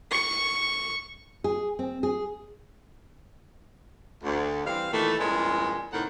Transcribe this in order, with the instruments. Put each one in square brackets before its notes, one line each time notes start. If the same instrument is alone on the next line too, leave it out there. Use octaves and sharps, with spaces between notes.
[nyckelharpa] C#6
[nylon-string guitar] G#4
C4
G#4
[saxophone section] D2
E3 G3 C4 F5
A#2 D#3 E3 A3
E2 G2 A#2 G#3 C#4
A2 C3 D#3 D#4 F#5